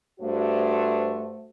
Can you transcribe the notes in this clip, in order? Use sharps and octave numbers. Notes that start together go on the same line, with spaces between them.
G2 A3 F#4 C5